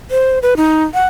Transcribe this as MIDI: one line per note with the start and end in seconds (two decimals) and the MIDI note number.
0.11 0.39 72
0.43 0.54 71
0.57 0.84 63
0.94 1.07 78